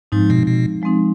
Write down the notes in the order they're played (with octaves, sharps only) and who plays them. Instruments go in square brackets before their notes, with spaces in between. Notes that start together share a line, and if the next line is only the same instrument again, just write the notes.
[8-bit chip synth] G#2 [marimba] F3 G#3 C4 D#4
[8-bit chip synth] B2
B2
[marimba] F3 G#3 C4 D#4